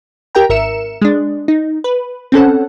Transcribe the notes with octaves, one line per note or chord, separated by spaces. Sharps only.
G4 A#4 G5 A#5
G#1 A#4 E5 C#7 E7
G#3 D4
D#4
B4
C4 C#4 A4 F#5